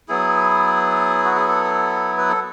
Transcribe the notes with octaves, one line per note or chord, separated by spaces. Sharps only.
F#3 B3 E4 G#4
F#4
G#4
A4
B4
A4